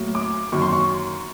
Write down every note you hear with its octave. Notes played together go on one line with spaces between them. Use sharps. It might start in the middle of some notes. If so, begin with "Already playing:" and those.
Already playing: A2 F#3 A#3
D6
F#2 D#3 F#3 A#3 C#6
C6
C#6